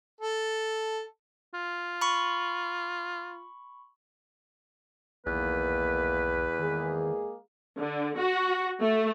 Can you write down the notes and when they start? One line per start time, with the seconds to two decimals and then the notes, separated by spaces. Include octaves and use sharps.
0.21 A4
1.54 F4
2.01 B5 C#6
5.26 B1 E2 D#3 A#3 B4
6.59 D#3 G#3 A#3 G#4
7.77 D3
8.17 F#4
8.80 A3